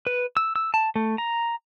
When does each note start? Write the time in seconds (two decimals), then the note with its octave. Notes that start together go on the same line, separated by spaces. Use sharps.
0.07 B4
0.37 E6
0.56 E6
0.74 A5
0.96 A3
1.18 A#5